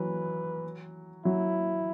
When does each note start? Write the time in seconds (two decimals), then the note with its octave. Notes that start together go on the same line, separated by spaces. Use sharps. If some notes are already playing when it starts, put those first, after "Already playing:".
Already playing: E3 F#3 B4
1.25 F#3 E4